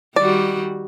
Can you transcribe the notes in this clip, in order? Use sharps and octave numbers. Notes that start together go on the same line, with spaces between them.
D#3 G3 F#4 D5